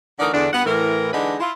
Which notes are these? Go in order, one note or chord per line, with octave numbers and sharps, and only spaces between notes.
D3 E3 A3 D#4 A#4 D5
E2 D3 D4
G2 B3 B4 F#5
A2 E3 A#4
D3 E3 G#3 D4 D#4 B4
E4 F4